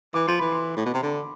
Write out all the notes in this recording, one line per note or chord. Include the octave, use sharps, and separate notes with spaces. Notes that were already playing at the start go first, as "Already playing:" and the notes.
E3 D6
F3 C6
E3 B5
C6
A2
B2
C3
D3